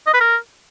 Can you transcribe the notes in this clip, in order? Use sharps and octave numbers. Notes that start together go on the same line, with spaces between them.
D#5
B4
A#4